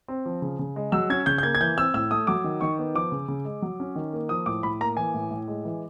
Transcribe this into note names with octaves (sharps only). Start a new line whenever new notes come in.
C4
F3
C#3
C#3
G#3
F#3 E6
C#4 G#6
C#3 G6
G6
A#3 G#6
G#6
E3 G6
C4 E6
A2 E6
A3 D#6
F#3 D6
D#3
D#3 C#6
B3
F3 D6
C#3
C#3
G#3
F#3
C#4
D#3
A#3
F3 D#6
A2 D6
A2 B5
A#3 A#5
E3 G#5
A2
A2
G#3
E3